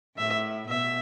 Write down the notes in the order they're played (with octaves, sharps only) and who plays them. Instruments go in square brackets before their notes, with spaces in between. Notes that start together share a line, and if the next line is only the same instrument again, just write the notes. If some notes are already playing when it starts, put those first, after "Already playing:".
[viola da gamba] A2 [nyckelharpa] E5
[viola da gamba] B2 [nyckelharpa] E5